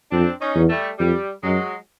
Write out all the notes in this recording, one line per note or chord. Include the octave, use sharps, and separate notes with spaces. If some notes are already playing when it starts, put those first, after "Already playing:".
F2 C4 D4
C#4 D#4
E2
G3 A3
F2 G3
F#2 F#3 G#3